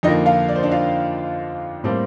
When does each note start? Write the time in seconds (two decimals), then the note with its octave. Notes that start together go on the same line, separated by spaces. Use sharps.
0.03 F2 D3 F3 A#3 D#4 D#5
0.26 F4 F5
0.49 D5
0.56 C5
0.63 D4 D5
0.71 F4 F5
1.84 A2 G3 A#3 C4 C5